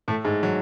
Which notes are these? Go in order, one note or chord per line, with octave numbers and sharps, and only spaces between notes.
A2 A3
G#2 G#3
F#3